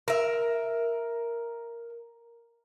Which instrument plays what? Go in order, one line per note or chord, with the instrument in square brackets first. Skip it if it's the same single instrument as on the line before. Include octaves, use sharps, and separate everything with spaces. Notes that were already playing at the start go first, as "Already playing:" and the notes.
[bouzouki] A#4 E5